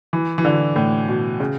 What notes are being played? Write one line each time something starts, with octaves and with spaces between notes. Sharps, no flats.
E3
E3
D3
A2
B2
C#3